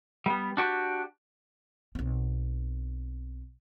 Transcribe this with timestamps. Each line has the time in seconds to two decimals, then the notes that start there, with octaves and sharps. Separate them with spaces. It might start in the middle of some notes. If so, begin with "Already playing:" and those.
0.26 G3 B3
0.57 D4 F#4 G4
1.95 B1 C4